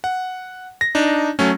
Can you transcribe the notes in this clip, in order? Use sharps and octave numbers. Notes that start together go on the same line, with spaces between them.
F#5
A#6
D4 D#4
F#3 A3 C#4